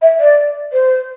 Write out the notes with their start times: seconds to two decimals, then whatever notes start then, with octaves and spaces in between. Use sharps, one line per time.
0.01 E5
0.19 D5
0.72 C5